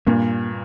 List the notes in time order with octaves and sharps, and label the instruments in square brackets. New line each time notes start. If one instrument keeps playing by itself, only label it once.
[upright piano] G2 A#2 [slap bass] A#3